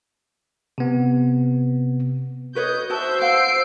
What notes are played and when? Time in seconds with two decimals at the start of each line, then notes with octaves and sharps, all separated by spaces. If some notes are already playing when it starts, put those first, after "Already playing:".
0.78 C3 B3
2.55 F#4 B4 C#5 D#5 G6
2.90 F#4 C5 E5 A5 E6 G6
3.21 F5 F#5 C7 D7